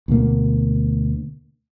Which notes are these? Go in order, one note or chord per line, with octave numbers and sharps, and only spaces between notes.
D2 B2 A#3